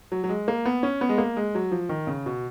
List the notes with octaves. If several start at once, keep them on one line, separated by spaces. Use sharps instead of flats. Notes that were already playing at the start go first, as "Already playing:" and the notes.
F#3
F#3
G#3
A#3
B3
C#4
B3
G#3
A#3
G#3
F#3
F3
D#3
C#3
B2